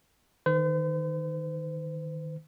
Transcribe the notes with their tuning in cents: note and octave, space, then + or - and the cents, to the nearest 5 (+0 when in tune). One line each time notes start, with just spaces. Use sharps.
D#3 +0 C5 -45